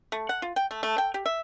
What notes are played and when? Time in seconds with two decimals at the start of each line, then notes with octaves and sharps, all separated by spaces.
0.12 A3
0.29 F#5
0.42 F4
0.56 G5
0.71 A3
0.83 A3
0.98 G5
1.14 G4
1.26 E5